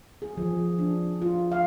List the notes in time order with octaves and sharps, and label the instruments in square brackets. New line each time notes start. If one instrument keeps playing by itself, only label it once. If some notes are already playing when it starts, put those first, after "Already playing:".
[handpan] G#4
F3
D4
F4
F5